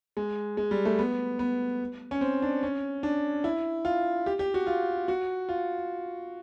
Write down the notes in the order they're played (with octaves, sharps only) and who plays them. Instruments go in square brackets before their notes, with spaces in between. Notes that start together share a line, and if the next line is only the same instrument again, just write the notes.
[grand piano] G#3
G#3
G3
A3
B3
B3
C#4
C4
D4
C#4
D4
E4
F4
G4
G4
F#4
F4
F#4
F4